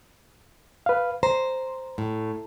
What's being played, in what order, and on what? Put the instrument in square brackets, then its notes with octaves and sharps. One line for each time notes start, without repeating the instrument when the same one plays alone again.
[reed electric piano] B4 F5
[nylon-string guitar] C5 [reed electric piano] A#5
[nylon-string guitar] A2